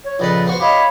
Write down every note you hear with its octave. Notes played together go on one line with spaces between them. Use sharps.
C#5
A#1 C#3 A4 B4 D5 D#5
B3 F#4 C5 F#5
G4 C#5 D#5 F5 B5